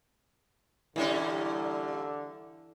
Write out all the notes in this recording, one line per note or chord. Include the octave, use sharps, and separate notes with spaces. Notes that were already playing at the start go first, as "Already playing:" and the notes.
A#2 D3 E3 G3 C#4